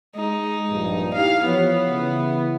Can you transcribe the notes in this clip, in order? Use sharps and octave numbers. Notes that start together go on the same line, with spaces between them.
G#3 D#4
A#1 G2
D#4 E4 G4 F5
E3 F3 B3 C#5
C#3 E3 E4